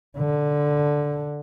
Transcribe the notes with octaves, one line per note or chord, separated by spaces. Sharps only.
D3